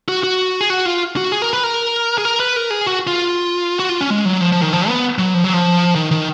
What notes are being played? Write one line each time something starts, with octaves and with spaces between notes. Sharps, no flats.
F#4
F#4
G#4
F#4
F4
F#4
G#4
A#4
B4
A#4
G#4
A#4
B4
A#4
G#4
F#4
F4
F#4
F4
C#4
G#3
F#3
F3
F3
D#3
F3
B3
F#3
F3
F#3
F3
D#3
D#3